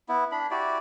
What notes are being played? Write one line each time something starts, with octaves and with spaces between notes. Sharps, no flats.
B3 E4
D4 B5
E4 F#4 G4 D5